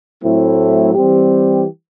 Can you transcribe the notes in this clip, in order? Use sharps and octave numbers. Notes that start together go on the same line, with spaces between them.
A2 F#3 A3 C4 E4
E3 G3 C4 G4